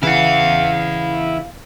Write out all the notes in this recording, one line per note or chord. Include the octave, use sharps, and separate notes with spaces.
C#3 E3 E4 F5 F#5